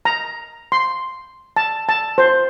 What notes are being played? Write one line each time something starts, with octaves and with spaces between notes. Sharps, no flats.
A#5
C6
A5
A5
C5